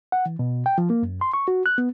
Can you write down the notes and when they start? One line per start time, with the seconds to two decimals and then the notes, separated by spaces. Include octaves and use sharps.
0.12 F#5
0.26 E3
0.39 B2
0.66 G5
0.78 F3
0.90 A#3
1.03 F#2
1.21 C6
1.34 C#6
1.48 F#4
1.66 F#6
1.78 B3